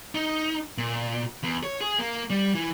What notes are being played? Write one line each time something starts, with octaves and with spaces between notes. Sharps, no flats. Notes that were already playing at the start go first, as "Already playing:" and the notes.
D#4
A#2
E2
C#5
G#4
A#3
G3
E3